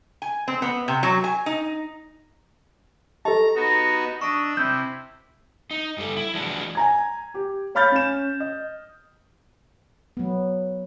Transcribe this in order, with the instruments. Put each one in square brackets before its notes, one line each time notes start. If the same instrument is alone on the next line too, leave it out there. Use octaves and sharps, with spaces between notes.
[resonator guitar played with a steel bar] G#5
C4
B3
C3
F#3
G#5
D#4
[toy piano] G4 D#5 [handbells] A4 A5 [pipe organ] A#5
[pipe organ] B3 D#4 F#4 [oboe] A#5
[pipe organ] D4 E6 [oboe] D#5 [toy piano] C#6
[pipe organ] C3 [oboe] E4 [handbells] G6
[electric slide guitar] D#4
G2 G3 A4
E4
E3 F3 G#3 D4 F#4
[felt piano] G#5 A#5 G#6
G4
C#5 F5 B5 F6 G6 A6
C#4 E7
D#5
[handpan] F#3 B3